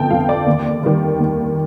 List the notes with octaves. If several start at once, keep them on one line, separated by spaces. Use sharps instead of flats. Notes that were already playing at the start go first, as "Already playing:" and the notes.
Already playing: G1 F2 D3 G5 A5
F2 D3 F5
D5
D#2
D#3 G3
D#2